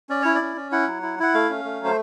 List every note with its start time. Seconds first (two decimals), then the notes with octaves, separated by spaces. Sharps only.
0.09 C#4 D5
0.22 E4 C#5
0.35 D5
0.41 C#4
0.56 C#4
0.72 E4 F#5
0.87 F#3
1.02 E4
1.19 E4 F#5
1.34 A3 F5
1.49 C#4
1.65 A3
1.80 F#3 C5